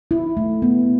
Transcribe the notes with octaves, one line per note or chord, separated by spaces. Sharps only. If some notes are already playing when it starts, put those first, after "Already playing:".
E4
A3
B3